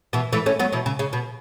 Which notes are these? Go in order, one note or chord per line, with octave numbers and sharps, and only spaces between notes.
B2 E3
E3 A3
A3 C#4
F#3 B3
B2 E3
C#3
C#3
B2